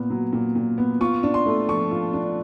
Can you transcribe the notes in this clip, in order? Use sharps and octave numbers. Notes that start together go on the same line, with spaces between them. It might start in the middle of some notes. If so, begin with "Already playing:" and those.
Already playing: A#2 B3
F#3
A#2
A#2
B3
F4 C#6
D4
C6
A3
F3 C#6
F4
D4